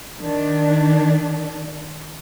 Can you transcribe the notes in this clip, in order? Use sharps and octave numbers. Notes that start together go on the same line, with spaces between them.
D#3 D4